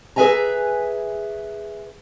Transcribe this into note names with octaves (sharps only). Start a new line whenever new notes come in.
G#4 B4 D5 E5 G#5 A#5